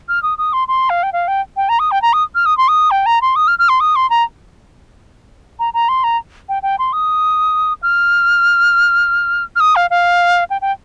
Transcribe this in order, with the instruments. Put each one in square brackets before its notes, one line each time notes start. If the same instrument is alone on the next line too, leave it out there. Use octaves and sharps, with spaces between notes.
[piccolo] F6
D#6
D#6
C6
C6
F5
G5
F5
G5
G5
A#5
D#6
G5
A#5
D#6
F6
D#6
C6
D#6
G5
A#5
C6
D#6
F6
F6
C6
D#6
C6
A#5
A#5
A#5
C6
A#5
G5
G5
C6
D#6
F6
F6
D#6
F5
F5
G5
G5